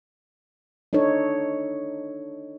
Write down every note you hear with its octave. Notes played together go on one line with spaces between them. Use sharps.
D4 D#4 A4 C#5